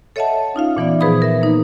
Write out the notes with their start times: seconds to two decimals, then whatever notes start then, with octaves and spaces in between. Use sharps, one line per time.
0.16 A4 C#5 D#5 E5 F#5 A5
0.54 C#4 D#4 F4 F5
0.77 A#2 E3 B3 D5
1.00 F3 G#4 B4 C5 B5 D#6
1.22 A#4 E5
1.41 A#3 D#4